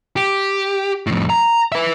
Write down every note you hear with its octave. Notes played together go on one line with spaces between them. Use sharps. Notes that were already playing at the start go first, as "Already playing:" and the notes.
G4
F2 A2
A#5
B4 E5